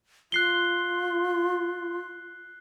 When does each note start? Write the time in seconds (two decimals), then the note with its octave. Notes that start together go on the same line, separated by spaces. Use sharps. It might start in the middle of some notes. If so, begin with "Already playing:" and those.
0.32 F4 F#6 C7 G7